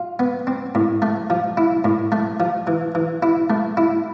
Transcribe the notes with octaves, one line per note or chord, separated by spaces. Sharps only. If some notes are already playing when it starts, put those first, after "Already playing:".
Already playing: F4
B3
C4
A2
A3
F3
E4
A2
A3
F3
E3
E3
E4
A3
E4